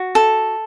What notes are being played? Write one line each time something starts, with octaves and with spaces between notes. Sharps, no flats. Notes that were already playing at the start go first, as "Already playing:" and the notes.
Already playing: F#4
A4